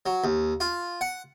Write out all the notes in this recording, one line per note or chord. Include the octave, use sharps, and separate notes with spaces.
F#3
D#2
F4
F#5